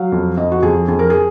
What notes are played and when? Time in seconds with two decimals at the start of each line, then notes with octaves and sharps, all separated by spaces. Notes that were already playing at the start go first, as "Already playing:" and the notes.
Already playing: F#3 F5
0.12 F2
0.37 F2 D#5
0.52 F#4
0.63 F2 G#4
0.88 F2 G#4
0.99 A#4
1.10 G#4